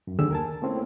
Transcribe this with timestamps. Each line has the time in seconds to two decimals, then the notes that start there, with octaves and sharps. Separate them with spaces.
0.07 F#2
0.19 D#2 D3 G4 G#4 E6
0.30 A#4 G#5 A5
0.62 A3 A#3 C4 C#4 E4